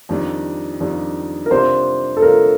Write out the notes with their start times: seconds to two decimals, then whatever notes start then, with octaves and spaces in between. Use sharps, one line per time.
0.09 F2 D#3 G3 D4
0.80 F2 D#3 G3 D4
1.46 A#4
1.51 C3 G3 D4 F4 C5
2.17 A4
2.22 C3 G3 D4 F4 A#4